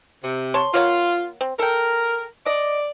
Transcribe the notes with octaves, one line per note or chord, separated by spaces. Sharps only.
C3
C#5 A5 C6
A#3 F4 C#5 F#5
C4
A4 A#4 G5
D5 D#5